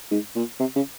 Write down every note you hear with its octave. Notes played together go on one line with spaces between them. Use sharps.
G#2
A#2
C3
C#3